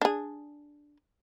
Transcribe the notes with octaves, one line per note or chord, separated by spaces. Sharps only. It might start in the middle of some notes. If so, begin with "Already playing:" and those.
D4 G#4